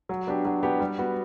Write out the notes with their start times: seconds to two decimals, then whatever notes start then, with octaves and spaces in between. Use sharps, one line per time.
0.09 F#3
0.27 B3 D4 G4
0.45 F#3
0.63 B3 D4 G4
0.80 G3
0.98 B3 F#4